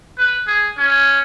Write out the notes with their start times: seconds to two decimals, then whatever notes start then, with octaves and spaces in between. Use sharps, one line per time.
0.18 B4
0.47 G#4
0.78 C#4